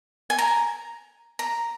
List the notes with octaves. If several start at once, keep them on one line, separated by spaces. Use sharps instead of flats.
G#5
A#5
A#5